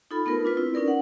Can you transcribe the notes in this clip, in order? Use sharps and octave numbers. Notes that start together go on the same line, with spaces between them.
D#4 F4 A4 B5
A3 B3 D#4 F4 A#4 B4
D4 F4 B4
C4 E4 B4
C#4 D#4 A#4 D5
F#5